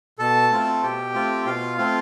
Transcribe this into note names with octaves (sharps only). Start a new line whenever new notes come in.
B2 A4 A5
A3 C4 F4
B2 G4 G5
A3 C4 F4
B2 F4 F5
A3 C4 F4